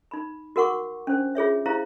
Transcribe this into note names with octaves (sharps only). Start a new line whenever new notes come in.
D#4 B5
F#4 A#4 F#5 C#6 D6
C#4 D4 C5
F4 G#4 C#5 E5
E4 G4 C5 F5 A#5